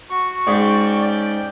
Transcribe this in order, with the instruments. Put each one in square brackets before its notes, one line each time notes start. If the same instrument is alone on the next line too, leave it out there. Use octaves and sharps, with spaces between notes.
[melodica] F#4 C#6
[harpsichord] G#2 [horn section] C#4 D5 G5